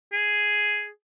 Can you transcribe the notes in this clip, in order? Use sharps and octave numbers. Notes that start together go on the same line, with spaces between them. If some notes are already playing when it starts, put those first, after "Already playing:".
G#4